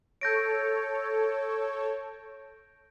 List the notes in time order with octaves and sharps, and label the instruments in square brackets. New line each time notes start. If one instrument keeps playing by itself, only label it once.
[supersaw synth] A4 C#5 [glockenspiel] G6 A#6 D7